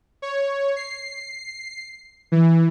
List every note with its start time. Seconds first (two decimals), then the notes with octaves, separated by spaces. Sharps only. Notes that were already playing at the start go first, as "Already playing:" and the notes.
0.22 C#5
0.76 C7
2.32 E3